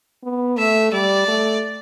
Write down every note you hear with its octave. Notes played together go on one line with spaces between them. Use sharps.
B3
A3 E5
G3 D5
A3